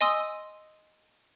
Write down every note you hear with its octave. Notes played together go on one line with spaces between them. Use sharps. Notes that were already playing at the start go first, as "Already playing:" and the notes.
D#5 G#5 C6 D#6 E6